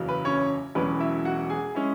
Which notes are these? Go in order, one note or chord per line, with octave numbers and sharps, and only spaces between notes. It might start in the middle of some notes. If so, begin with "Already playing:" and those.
Already playing: F#1 E2 C#3 F#3
B4
C#4 C#5
E1 E2 B2 F#3 C#4 B4
E4 E5
F#4 F#5
G#4 G#5
G#3 C#4 E4